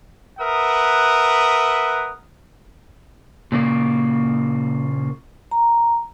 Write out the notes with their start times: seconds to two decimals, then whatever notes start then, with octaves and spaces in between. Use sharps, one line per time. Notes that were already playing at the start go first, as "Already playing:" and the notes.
0.39 A#4 B4 E5 F#5 D#6
3.52 A#2 C#3 A#3
5.51 A#5